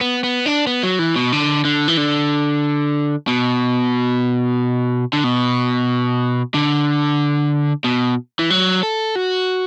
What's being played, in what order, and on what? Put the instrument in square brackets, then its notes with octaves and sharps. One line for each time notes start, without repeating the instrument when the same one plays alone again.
[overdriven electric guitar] B3
B3
D4
B3
F#3
E3
B2
D3
D3
E3
D3
B2
D3
B2
D3
B2
E3
F#3
A4
F#4